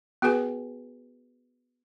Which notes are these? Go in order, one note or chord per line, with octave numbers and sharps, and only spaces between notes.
B3 F#4 G#4 B4 G#5